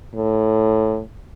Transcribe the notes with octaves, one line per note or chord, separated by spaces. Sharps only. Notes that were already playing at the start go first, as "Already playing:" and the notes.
A2